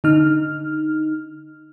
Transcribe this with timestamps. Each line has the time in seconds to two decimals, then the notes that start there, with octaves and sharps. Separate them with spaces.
0.04 D3 D#4 F6